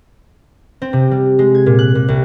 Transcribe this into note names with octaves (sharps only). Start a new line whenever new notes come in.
C4
C3
G3
G#3
G#6
A#2
F#6
A#2
C2